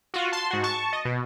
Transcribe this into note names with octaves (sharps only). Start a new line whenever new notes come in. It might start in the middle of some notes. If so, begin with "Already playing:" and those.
F4 F#4
A5 C6
G#2 F#4
A5 C#6
D#5
B2